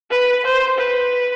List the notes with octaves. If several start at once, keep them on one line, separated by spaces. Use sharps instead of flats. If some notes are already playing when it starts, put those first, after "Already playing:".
B4
C5
B4